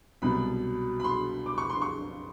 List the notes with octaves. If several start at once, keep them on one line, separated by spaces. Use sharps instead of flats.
C2 B2 F#3 B5
B5
C6
D6
C#6
C6
C#6